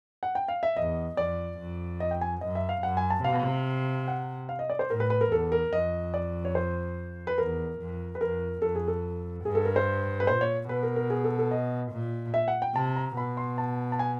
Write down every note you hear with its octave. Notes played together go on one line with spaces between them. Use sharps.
F#5
G5
F5
E5
E2 D#5
F2 D5
F2
D#5
G5
G#5
F#2 D#5
E5
F5
F#2 F#5
G#5
A5
C3 F5
F#5
F5
D#5
D5
C5
A2 A#4
B4
B4
A#4
E2 A4
A#4
F2 D#5
D5
C#5
C5
B4
E2 A#4
F2
B4
F2 A#4
F2 A4
G#4
A4
G2 G#4
A4
A#4
C5
B4
A#2 C5
C#5
B2 B4
A#4
A#4
G#4
A4
A4
D#5
A#2
E5
F#5
G5
C3 A5
A#5
B2 B5
C6
A5
A5
G#5